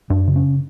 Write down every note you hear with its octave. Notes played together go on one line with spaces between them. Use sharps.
F#2 D4
C#3
C#4